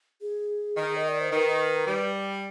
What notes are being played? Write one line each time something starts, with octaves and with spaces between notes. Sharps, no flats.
G#4
D#3
D#5
D5
C5
D#3 B4
G3